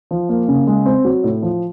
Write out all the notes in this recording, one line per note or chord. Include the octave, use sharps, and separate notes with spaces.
F3
A#3
C#3
G#3
C4
F#3
A2
F3